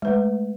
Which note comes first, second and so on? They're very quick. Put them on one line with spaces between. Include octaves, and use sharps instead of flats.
G#3 B4 A3